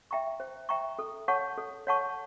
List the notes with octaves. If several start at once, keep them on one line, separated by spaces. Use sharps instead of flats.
E5 G5 A#5 C#6
C5
E5 G5 A#5 C#6
A4
C#5 F#5 A5 C#6
A4
C#5 F#5 A5 C#6